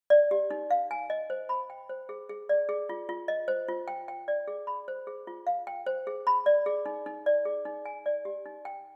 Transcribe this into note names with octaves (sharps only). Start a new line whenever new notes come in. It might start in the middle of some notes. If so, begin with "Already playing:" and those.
D5
G4
D#4
F5
G#5
D#5
C5
B5
G5
C5
G#4
G#4
D5
G#4
F4
F4
D#5
C5
F4
G5
G5
D5
G#4
B5
C5
G#4
F4
F5
G5
C5
G#4
B5
D5
G#4
D#4
D#4
D5
G#4
D#4
G#5
D5
G4
D#4
G5